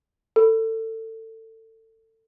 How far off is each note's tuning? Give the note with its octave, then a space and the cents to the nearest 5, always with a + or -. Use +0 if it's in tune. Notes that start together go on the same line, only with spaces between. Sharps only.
A4 +25